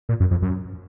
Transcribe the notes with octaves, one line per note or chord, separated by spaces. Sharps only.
A#2
F#2
F2
F#2